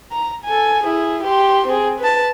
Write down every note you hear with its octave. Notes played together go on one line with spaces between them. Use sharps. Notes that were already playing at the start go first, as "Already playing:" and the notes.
A#5
A4 G#5
E4 G#4
G4 C6
C4 G#4
B4 A5